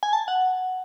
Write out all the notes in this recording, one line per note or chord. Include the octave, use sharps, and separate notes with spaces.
G#5
A5
F#5